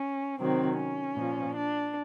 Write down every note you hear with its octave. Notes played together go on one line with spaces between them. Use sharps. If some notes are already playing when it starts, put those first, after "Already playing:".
Already playing: C#4
C3 D#3 F#3 C4
C#4
A#2 F3
D4